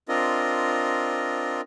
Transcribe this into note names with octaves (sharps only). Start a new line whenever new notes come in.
C4 D4 F4 A#4 D#5